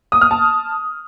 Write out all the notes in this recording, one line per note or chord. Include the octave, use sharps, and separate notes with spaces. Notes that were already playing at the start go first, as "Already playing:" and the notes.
D#6
F6
A5